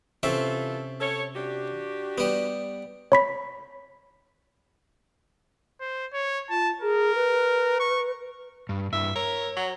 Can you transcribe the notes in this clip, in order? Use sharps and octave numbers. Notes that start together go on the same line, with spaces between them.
C3 E3 C#4 F4 A4 E5
A4 C#5
D4 F#4 G4
G3 B3
C#5 B5 B6
C5
C#5
F4 A5
G#4 A#4
B4
C#6
G2
G2 E4 E5
A#4 C#5
F#3